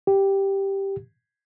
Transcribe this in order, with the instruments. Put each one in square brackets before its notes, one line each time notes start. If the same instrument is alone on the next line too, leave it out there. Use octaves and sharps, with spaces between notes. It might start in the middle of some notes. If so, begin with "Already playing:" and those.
[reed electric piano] G4